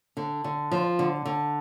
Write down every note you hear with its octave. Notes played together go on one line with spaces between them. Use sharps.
D3
D3
F3
D3
D3